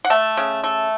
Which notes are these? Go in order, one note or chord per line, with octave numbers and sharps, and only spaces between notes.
F#5
A3 A5
C#3
A3